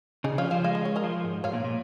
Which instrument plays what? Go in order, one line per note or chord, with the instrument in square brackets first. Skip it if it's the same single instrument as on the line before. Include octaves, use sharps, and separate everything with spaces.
[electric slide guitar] C#3 [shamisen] D#4 G#4
[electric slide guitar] F3 [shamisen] C#5 F5
[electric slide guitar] F3 [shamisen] C#5 F5
[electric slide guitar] G#3 [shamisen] F5
[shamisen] D#5
C#5
A#4 D#5
[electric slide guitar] F3
G#2
[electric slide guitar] G#2 [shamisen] C#5 F5
[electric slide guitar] A#2
A#2